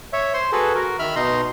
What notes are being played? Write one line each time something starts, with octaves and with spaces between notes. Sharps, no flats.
C#5 E5
C5 C6
F#4 G#4 A4 B4
F#4 A#4
D#3 E5 B5 F6
B2 D#4 A#5 C6